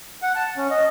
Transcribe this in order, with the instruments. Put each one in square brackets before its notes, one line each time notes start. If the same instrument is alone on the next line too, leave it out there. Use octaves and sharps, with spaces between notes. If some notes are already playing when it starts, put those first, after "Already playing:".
[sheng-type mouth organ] F#5
A5
C#4
D#5